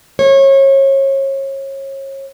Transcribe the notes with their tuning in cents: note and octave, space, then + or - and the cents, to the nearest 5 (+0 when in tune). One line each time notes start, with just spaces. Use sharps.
C#5 -30